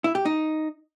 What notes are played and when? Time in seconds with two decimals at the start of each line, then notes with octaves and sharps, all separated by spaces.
0.04 E4
0.15 G4
0.25 D#4